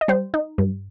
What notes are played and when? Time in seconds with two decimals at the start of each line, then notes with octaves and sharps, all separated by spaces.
0.01 D#5
0.08 G3 C5
0.34 D#4
0.58 G2